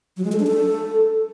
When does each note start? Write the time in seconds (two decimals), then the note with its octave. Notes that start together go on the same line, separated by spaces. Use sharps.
0.17 F#3
0.25 G#3
0.32 A4
0.40 D4
0.47 A4